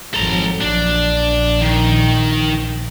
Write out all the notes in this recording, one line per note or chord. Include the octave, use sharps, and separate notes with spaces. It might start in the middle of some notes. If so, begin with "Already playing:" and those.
G#1 F2 F#3 A4 A#5
A#1 D4
D#3